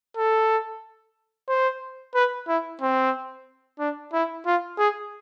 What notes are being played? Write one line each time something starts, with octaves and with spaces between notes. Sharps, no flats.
A4
C5
B4
E4
C4
D4
E4
F4
G#4